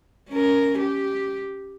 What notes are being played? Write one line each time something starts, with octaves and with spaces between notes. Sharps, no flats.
C#4 A#4
G4